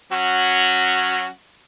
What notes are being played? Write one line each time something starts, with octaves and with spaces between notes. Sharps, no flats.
F#3 C#4 F#4